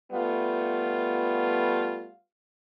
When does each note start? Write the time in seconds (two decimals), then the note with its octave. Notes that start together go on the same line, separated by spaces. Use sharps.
0.12 G3 A3 B3 F4